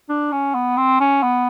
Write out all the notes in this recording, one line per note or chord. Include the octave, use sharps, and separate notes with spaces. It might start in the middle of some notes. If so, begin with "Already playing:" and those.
D4
C#4
B3
C4
C#4
B3